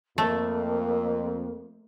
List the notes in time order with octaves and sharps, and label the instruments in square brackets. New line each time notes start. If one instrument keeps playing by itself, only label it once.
[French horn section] F2 [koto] A3 [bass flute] A#3